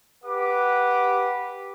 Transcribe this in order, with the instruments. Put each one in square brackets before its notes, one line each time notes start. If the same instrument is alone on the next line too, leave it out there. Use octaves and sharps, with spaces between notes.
[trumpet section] G4 B4 F#5 D6